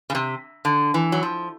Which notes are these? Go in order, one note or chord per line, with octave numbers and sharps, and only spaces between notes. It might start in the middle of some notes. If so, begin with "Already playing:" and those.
C#3
C3
D3
E3
F#3
F3